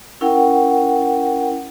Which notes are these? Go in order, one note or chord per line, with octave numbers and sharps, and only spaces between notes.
C#4 E4 A#4 F#5 G5